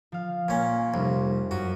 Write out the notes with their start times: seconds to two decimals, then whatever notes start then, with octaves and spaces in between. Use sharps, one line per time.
0.12 F3 F5
0.48 A#2 C#4
0.94 F1 C2
1.51 F#2 F#4